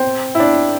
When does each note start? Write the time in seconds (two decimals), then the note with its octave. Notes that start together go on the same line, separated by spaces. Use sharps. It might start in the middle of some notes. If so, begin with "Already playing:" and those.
Already playing: C4
0.35 E4
0.40 D4